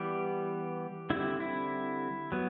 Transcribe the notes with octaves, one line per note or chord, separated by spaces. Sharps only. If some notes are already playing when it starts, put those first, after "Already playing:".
Already playing: E3 G3 B3 G4
D3 G3 C4 E4
E4
F#3 B3